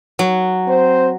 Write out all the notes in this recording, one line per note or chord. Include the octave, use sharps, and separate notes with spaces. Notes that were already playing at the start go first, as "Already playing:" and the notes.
F#3
C4 C5